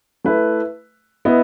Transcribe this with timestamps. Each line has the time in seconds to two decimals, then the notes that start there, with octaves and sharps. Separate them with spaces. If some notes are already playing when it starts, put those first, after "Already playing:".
0.24 A3 E4 B4 E5
1.25 B3 E4 B4 D#5